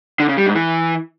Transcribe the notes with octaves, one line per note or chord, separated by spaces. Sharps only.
D3
C#3
G3
G#2
E3